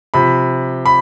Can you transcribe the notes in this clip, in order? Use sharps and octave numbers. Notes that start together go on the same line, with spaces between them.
C3 F3 B5
B5